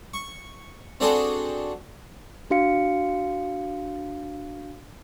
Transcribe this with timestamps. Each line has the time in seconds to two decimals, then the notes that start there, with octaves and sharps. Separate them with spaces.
0.14 C#6
1.00 C4 D4 F#4 G#4 A4 C5
2.50 D4 F#4 F5 C#7